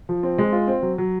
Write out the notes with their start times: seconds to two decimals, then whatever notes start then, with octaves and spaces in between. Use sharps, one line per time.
0.09 F3
0.23 C4
0.38 G#3
0.53 F4
0.67 C4
0.82 F#3
0.98 F#3